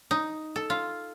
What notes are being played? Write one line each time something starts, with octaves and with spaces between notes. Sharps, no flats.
D#4
A4
F4